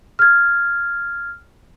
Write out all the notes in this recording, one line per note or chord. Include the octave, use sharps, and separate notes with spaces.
F6 G#6